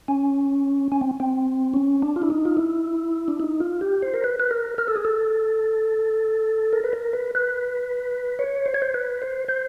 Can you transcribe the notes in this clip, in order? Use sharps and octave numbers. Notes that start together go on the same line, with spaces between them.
C#4
C#4
C4
C4
C#4
D4
F4
E4
D#4
F4
E4
D4
D#4
F4
G4
C5
A#4
B4
B4
A#4
A#4
A4
G#4
A4
A#4
B4
A#4
B4
B4
C#5
C5
C#5
C5
B4
C5
C5